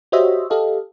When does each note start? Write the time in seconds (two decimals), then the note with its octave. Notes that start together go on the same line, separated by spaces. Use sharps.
0.12 F#4 G4 C5 C#5 D#5 E5
0.50 G4 A4 D#5 F5